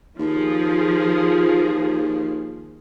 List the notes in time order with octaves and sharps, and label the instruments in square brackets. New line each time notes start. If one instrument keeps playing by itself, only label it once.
[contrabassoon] D#2 [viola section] F3 G#4